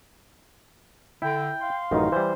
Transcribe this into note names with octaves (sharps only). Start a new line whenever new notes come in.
D3 E4 G5
F5 C6
A1 F#2 D#3 D#4
E3 G3 C5